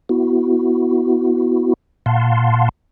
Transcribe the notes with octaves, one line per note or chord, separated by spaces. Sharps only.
B3 E4 F#4
A#2 F5 F#5 A5 C6